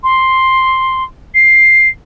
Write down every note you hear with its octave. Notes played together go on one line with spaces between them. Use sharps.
C6
C7